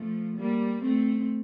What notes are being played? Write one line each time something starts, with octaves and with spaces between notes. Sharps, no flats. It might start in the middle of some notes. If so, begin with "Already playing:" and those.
Already playing: F3 A3
G3 A#3
A3 C4